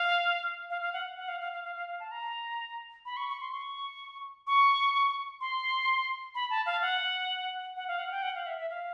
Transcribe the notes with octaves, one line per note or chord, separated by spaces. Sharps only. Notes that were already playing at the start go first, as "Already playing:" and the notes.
Already playing: F5
F5
F5
F#5
F#5
F5
F5
F5
F5
F5
F5
A5
A#5
B5
C#6
C#6
C6
C#6
C#6
C6
B5
A5
F5
F#5
F#5
F5
F#5
G5
F#5
F5
E5
E5
F5